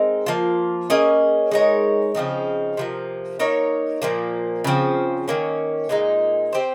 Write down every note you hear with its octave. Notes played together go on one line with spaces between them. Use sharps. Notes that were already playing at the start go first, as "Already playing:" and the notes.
Already playing: G#3 C4 D#4 A#4
F3 A#3 F4
A#3 C#4 G#4 D#5
G#3 D#4 A#4 C#5
C#3 F3 C4 D#4
C3 F3 A#3
A#3 D#4 A#4 C#5
A#2 F3 A#3
C#3 F3 C4
D#3 A#3 C#4
A#2 G#3 D#4
C4 G4 C5